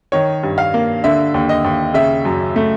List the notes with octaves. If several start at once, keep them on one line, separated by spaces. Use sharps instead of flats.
D#3 C#5
G2
F5
A#3
D3 E5
D#2
D#5
D#2
C#3 E5
F#2
A3